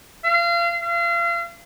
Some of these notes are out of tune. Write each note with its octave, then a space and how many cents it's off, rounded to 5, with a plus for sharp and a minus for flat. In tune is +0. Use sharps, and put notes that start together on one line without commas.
F5 -30
F5 -35